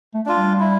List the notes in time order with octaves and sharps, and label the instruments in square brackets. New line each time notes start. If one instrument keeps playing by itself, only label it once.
[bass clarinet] A3
[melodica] D4 F4
[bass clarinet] G3
[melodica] E4